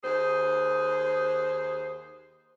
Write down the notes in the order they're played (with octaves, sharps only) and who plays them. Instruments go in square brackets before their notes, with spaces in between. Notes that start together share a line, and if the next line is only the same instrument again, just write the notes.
[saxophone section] D#2 G#4 C5